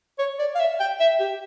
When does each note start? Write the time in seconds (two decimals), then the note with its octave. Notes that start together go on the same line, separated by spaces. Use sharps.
0.19 C#5
0.39 D5
0.55 F5
0.60 E5
0.80 G5
1.00 E5
1.20 G4